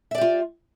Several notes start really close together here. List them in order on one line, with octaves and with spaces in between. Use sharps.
E5 D5 G4 F4